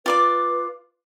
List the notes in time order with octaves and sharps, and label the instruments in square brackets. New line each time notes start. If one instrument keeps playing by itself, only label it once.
[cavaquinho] F4 D5 D6 [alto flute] B4